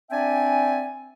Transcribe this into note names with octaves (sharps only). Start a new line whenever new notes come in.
C4 D4 D5 E5 G5 G#5